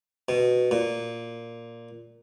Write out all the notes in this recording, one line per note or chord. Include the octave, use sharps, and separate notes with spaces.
B2
A#2